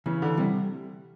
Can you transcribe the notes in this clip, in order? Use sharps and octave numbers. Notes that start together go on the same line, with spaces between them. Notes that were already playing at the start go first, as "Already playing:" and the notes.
C#3 E3
D3
C3 G3